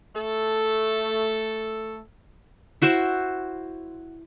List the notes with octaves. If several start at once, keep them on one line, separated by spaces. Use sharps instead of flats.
A3 A4
E4 F#4 C5 E5